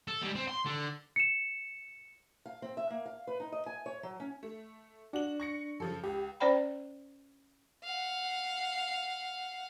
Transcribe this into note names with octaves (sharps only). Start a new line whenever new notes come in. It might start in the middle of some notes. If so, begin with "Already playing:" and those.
A4
G3 G#3
C4
C6
D3
C#7 E7
F5
C4
E5
A#3
F5
B4
D#4
D#5
G#5
C#5
F#3
C#4
A3
D4 F#4 F#7
C#6 A#6 C#7
F#2 C#3 F3 A4 A5
C#2 G4
C#4 C5 D5 G5 B5
F5 F#5